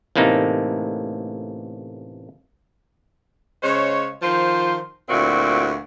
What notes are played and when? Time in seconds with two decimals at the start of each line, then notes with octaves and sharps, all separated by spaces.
0.15 A1 A2 C3 A#3 D#4
3.63 C#3 G#3 C5 C#5
4.22 D#3 F3 F4 C5
5.09 D2 A#2 C4 E4 F#4